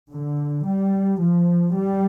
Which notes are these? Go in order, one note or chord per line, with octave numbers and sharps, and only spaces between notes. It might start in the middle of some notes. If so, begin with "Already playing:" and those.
D3
G3
F3
G3